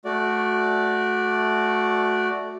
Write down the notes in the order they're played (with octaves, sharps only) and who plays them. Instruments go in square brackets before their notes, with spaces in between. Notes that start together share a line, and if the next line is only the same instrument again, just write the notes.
[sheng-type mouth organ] A3 F#4 D5